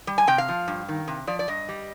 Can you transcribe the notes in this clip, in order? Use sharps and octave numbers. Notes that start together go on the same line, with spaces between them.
G3
G#5
C3 G5
F5
F3
G2
D#3
C3
F3 D5
D5
G2 D#5
G3